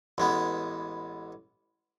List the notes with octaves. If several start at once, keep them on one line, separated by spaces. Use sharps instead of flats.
A1 G#3 B3